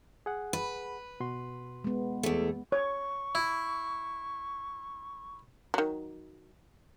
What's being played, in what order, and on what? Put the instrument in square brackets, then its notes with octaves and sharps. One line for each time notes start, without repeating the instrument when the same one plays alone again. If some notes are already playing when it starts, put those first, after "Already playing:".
[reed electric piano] G#4 F#5
[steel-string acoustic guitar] B4
[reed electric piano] B2 F#4 C6
[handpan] G#3 B3
[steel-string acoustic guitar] E2 A3
[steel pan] C#5 [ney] C#6
[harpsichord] E4
[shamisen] D#3 F#3